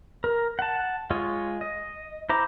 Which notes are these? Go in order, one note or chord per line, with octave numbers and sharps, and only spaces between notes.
A#4
F#5 A5
G#3 F4 C#5 D#5
D#5
E4 C5 A#5 D6